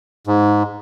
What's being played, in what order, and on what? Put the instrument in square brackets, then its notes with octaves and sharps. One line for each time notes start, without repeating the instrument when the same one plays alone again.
[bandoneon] G#2